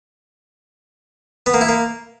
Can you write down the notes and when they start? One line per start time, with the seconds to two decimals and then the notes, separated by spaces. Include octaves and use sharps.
1.46 B3
1.54 A#3
1.61 E4
1.69 A#3